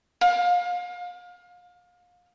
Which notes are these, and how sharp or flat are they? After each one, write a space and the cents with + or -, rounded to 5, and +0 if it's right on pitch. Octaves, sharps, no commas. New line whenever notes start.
F5 +30